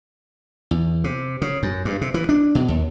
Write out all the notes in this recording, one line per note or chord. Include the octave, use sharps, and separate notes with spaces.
E2
C3
C#3
F#2
G2
C3
E3
D4
B2
D#2